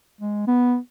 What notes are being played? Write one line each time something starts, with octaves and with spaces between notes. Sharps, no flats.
G#3
B3